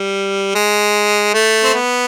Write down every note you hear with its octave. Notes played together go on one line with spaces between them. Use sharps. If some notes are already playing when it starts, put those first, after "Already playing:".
Already playing: G3
G#3
A3
C4
B3